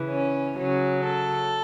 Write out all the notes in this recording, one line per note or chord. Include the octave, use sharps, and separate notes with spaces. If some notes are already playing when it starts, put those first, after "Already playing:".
Already playing: C#3 E3
C#4
C#3 F#3 C#4
A4